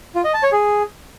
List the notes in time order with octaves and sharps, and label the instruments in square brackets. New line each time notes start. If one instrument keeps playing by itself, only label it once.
[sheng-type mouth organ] F4
D#5
A5
C#5
G#4